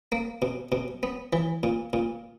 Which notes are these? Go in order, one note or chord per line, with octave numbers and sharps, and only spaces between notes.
A#3
B2
B2
B3
E3
A#2
A#2